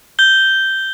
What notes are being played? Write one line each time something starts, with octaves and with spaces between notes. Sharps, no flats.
G6 G7